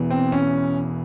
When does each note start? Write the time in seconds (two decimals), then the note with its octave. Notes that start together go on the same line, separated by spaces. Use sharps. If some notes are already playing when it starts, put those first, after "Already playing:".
Already playing: E1 E2 E3
0.10 C4
0.32 C#4